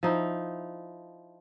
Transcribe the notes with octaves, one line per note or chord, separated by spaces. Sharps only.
F3 D#4 E4